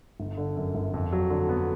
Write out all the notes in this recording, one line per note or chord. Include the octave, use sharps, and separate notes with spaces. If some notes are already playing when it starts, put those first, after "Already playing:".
G1
D3
F#2
G1
F2
F#3
D3
B3